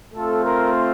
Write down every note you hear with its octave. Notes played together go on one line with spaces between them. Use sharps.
A3 C4 F4 A4
A#4